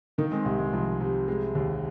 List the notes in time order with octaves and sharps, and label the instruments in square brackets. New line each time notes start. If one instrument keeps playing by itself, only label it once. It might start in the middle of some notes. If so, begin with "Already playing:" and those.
[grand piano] D#3 [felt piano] A#3 D#4
[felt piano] G#3 C4
[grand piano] C2 [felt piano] G#3
[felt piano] G#3
[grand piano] C2 [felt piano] F3
[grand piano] C3
G#3
D#2